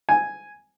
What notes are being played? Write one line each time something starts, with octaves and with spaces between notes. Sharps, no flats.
G#5